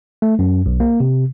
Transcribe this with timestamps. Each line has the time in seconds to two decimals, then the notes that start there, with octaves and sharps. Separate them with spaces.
0.22 A3
0.39 F#2
0.66 B1
0.80 A#3
1.00 C3